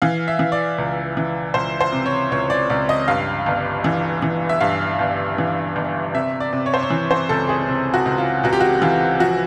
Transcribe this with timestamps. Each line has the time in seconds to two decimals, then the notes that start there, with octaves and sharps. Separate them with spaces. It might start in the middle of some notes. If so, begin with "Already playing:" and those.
0.02 E3 F5
0.28 E5
0.39 E3
0.52 D5
0.78 C#2
1.17 E3
1.54 C#2 C5
1.81 C5
1.92 C3
2.06 C#5
2.31 C#2 C#5
2.50 D5
2.70 C#2 D5
2.89 D#5
3.08 G2 F5
3.46 G1
3.84 E3
4.22 E3
4.49 E5
4.60 G2 F5
4.99 G1
5.38 E3
5.76 G1
6.14 C3 E5
6.40 D5
6.53 C3
6.66 C#5
6.74 C5
6.82 C#5
6.90 E3
7.11 C5
7.29 C#2 A4
7.49 G#4
7.67 C3
7.94 F#4
8.06 C#2
8.18 F4
8.43 C#2 F#4
8.53 G4
8.60 F#4
8.82 E3 F4
9.20 F3 F#4